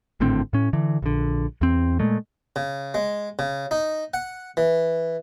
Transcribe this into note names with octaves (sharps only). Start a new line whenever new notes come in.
G#1 A2 D3 C4
A2 C#4
D3 E3
A#1 D3
E2 C4
A#2 G#3 A3
C#3
G#3
C#3
D#4
F#5
E3